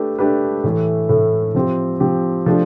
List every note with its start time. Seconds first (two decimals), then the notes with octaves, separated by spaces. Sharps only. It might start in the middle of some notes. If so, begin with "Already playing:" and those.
Already playing: A3 D4 G4 B4
0.19 A3 D4 G4 B4
0.64 A2 E3 A3
1.09 A2 E3 A3
1.55 F3 C4 G4
2.00 F3 C4 G4
2.46 F3 A3 D4 G4